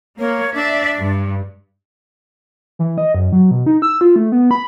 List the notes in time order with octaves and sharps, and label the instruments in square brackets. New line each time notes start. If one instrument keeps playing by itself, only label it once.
[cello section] A#3 [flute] C#5
[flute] D4 [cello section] D5 E5
[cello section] G2
[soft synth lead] E3
D#5
F#2
F#3
B2
D#4
E6
F4
A3
B3
B5